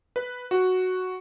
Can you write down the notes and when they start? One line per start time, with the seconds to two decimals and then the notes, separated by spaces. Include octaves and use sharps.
0.16 B4
0.51 F#4